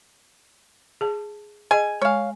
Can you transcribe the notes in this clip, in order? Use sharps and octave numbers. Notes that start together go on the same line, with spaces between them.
G#4 A5
G#4 D#5 G#5
G#3 C#5 F5 G#5